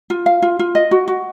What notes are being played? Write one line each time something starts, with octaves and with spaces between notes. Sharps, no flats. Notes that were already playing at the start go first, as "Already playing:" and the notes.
F4
F5
F4
F4
D#5
F#4
F#4